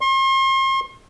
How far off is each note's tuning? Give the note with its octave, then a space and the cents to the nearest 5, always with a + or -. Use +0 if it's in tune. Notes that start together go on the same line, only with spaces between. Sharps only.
C6 +40